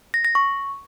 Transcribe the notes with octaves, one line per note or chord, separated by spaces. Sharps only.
A#6
A#6
C#6